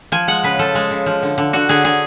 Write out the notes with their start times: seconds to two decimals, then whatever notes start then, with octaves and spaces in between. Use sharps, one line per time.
0.12 F3 G#5
0.28 G#3 F#5
0.44 C#3 B4
0.59 F3 A4
0.75 G#3
0.91 C#3
1.06 F3
1.22 D3
1.38 D3
1.53 D3 F#4
1.69 D3 G#4
1.84 D3 G#4